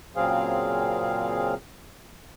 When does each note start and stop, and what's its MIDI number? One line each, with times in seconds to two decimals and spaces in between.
0.16 1.54 46
0.16 1.54 49
0.16 1.54 54
0.16 1.54 60
0.16 1.54 68
0.16 1.54 77